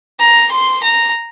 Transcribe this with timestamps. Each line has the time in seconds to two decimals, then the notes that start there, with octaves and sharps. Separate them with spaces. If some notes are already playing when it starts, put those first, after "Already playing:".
0.19 A#5
0.51 C6
0.83 A#5